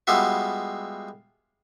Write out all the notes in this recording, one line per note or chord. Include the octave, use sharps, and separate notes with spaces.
G3 G#3 B3 F4 F#4 E5